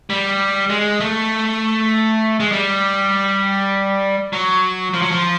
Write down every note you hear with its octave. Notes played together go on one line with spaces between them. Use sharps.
G3
G#3
A3
G#3
G3
F#3
F3
F#3
F3